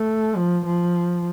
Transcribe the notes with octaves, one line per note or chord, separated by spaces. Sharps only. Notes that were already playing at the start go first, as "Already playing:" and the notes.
Already playing: A3
F3
F3